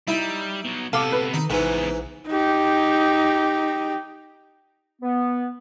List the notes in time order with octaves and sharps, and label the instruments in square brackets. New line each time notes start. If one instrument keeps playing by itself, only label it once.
[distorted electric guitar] G3 [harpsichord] D#4 [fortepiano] E4
[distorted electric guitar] B2 F#3
[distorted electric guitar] C3 B3 [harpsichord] A4 [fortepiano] F5 D6
[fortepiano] B4
[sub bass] D#3 [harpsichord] D#4
[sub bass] A#1 [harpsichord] G#2 E3 [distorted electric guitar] C#3 B3
[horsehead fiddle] D#4 G4
[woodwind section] B3